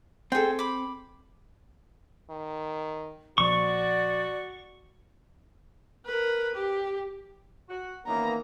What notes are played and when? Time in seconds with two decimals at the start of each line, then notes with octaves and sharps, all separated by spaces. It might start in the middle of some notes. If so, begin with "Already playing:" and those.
0.32 C4 G#4 A4 G5
0.59 B5 D6
2.30 D#3
3.38 A#1 F3 F#4 D5 C#6
6.05 A#4 B4
6.54 G4
7.69 F#4
8.06 D#3 E3 A#3 B3 C#4 A#5